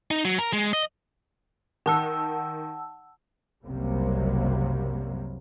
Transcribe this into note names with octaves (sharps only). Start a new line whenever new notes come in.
D#4
F#3
A#4
G#3
D#5
D#3 F#5 A5 E6
F#1 C2 C3 F#3 G3 A#3